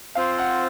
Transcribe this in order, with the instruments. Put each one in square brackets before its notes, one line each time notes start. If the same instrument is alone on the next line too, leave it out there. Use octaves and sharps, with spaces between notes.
[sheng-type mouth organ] C4 F4 C5 [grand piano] F5
[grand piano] F#5